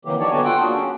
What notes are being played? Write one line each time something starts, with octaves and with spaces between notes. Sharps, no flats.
C3 D#3 E3 F#3 A#3 G4
F#3 D4 D#4 G4 C#5 D5
D3 F#3 B3 F#4 G4 G#5
F4 A4 F#5 G5
A#3 D4 F#4 G#4
F#3 C#4